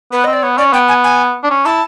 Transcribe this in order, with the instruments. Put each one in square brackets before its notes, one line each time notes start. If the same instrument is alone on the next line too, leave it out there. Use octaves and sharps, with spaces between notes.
[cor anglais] B3 [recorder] B4
[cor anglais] C4 [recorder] D#5
[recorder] D5
[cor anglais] B3 [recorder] C#5
[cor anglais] C#4 [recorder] D5
[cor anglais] B3 [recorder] G5
[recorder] G#5
G#5
[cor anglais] D4
C#4
[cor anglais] E4 [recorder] A5